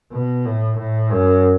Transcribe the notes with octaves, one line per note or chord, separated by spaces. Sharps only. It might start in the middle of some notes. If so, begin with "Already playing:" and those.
B2
A2
A2
F#2